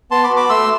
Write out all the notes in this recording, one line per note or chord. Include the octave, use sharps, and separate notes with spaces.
B3 A5 C6
B5 D6
F#4
B5 D6
A3 C6 E6